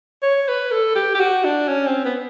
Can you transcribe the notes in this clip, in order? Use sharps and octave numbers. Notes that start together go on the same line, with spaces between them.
C#5
B4
A4
G4
G4
F#4
D4
C#4
C4
B3